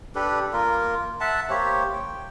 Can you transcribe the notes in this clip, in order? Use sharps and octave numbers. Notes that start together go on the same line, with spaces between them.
D4 G4 A4 B4
A#3 F4 A#4
E5 F#5 A5
A#3 G4 C5 C#5
G5